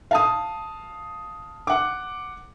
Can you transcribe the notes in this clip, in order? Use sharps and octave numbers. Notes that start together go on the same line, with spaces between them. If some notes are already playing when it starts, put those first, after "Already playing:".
F5 A5 D#6
F#5 D6